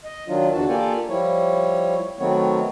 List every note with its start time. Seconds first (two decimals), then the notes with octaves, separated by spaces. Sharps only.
0.04 D#5
0.28 D#3 F#3 D4 F4
0.53 E2 D3 E3 D4 F#4 A5
0.68 A#3 F4 G4 A4 D5 G#5
1.09 F3 G3 E4 C#5
2.20 D#3 F#3 A3 B3 C4 C#5